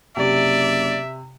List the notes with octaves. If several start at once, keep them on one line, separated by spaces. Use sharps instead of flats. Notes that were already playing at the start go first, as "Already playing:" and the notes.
F#1 C3 D5 E5